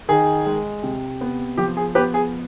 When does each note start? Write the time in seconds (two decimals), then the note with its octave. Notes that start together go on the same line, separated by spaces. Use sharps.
0.09 D#3 G#4
0.46 G#3
0.83 C3
1.21 B3
1.57 F3 G4
1.77 G#4
1.95 B3 G4 B4
2.14 G#4